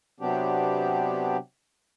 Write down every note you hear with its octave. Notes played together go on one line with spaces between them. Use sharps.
C3 F#3 B3 C4 D4 G4